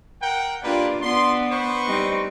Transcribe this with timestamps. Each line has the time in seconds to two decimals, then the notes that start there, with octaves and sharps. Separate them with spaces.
0.21 A#4 F#5 G5
0.63 A#3 D4 F4 G4 B4
1.01 B3 D4 C6
1.52 B4 C5 C#6
1.87 G3 C4 D#4